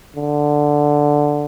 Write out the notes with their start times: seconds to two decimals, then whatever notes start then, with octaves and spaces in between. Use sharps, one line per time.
0.16 D3